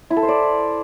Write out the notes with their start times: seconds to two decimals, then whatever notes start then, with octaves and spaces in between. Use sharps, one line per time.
0.10 E4
0.16 A4
0.22 C5
0.28 D5